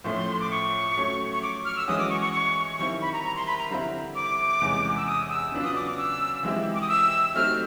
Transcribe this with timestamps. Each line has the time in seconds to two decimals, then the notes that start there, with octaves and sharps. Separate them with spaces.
0.04 A2 F3 A3 C#4 C6
0.40 D6
0.51 C#6
0.96 F#3 A3 C#4
1.32 C#6
1.42 D6
1.65 F6
1.76 E6
1.87 E3 G#3 C#4 F#4 D#6
1.99 D6
2.10 C#6
2.21 C#6
2.33 C#6
2.79 D#3 G3 C4 E4 C#6
3.02 B5
3.13 A#5
3.24 A#5
3.36 C6
3.47 B5
3.58 A#5
3.70 D3 G3 C4 E4
4.15 D6
4.61 E2 C3 E3 G#3 C#4
4.97 E6
5.06 D#6
5.30 E6
5.52 C#3 F#3 B3 D4 F4
5.64 D#6
5.76 D6
5.87 D6
5.98 E6
6.43 E3 G#3 C4 E4 G4
6.75 D6
6.81 D#6
6.89 E6
7.34 F#3 A3 C4 D#4 G4 F6